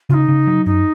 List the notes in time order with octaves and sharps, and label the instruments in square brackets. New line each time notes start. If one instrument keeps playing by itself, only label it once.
[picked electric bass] C#3 [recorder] F4
[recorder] D#4
[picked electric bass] C#3
F#3
[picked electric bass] F#2 [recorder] D#4